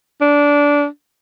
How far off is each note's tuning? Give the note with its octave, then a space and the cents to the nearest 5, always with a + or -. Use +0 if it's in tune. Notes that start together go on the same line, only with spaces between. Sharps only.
D4 -15